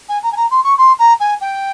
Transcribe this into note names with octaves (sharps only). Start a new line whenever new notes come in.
G#5
A#5
G#5
A#5
C6
C#6
C6
A#5
G#5
G5